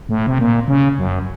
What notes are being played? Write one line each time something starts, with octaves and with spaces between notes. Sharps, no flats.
A2
C3
A#2
C#3
F#2